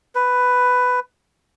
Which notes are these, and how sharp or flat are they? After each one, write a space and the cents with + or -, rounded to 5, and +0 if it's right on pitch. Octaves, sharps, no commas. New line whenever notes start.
B4 +10